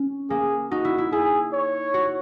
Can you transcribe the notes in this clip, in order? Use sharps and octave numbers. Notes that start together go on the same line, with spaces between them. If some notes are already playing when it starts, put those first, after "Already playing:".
Already playing: C#4
A#3 G#4
D#4 F#4
E4
E4
E4 G#4
C#5
F#4